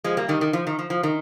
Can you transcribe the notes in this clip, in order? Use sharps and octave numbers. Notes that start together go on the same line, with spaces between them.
F3 G#3
G3 A#3
D#3 G3
D#3
F3
D#3
F3
F3
D#3